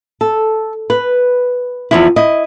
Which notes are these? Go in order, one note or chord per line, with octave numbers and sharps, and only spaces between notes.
A4
B4
E2 F3 E4
E4 D#5